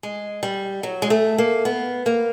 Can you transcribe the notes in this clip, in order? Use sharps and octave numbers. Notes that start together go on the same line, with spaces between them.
G#3
G3
F#3
G#3
A3
A#3
B3
A#3